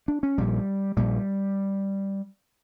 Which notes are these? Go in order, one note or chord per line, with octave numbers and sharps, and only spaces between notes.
D4
C#4
A#1 A#2 G3
A#1 A#2 G3